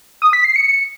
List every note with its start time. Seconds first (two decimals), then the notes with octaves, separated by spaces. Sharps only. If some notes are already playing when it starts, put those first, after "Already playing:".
0.22 D#6
0.33 B6
0.44 C7
0.56 C#7